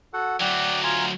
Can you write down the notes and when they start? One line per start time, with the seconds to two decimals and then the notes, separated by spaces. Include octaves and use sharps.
0.13 F#4 A4 F#5
0.41 D2 F#3 D5 F#5 G5
0.83 F4 G#5 A#5